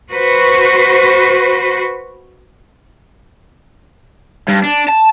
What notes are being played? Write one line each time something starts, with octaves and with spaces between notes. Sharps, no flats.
F#4 B4 C5
G2
D4
A5